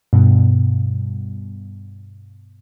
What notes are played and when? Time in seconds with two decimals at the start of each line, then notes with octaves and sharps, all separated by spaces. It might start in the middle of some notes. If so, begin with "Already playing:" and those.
0.13 G2 B2